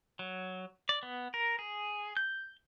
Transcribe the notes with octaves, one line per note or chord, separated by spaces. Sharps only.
F#3
D5
B3
A#4
G#4
G6